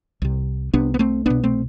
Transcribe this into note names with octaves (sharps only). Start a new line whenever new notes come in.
C2 C3
C2 C3 B3 D4
B3
A3 C4
C2 B2 B3 D4
A3 C4